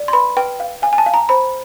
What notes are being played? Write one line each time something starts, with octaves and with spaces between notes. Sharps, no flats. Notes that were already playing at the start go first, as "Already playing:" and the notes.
Already playing: D5
C6
B4 B5
B4 G5
F5
F5 G#5
G#5
A5
F5
A#5
C5 B5